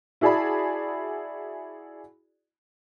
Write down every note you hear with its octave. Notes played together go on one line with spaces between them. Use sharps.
E4 F#4 G#4 D5 A5 B5